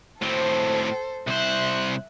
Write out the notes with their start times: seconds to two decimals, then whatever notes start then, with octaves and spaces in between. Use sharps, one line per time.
0.22 A2 C4 A4 C5
1.28 C2 C5 E5 F#6